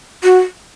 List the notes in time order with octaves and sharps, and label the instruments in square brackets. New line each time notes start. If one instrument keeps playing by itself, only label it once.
[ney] F#4